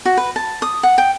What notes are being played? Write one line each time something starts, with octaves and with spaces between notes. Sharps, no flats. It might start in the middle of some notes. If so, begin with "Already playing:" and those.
F#4
B4
A5
D#6
F#5
G5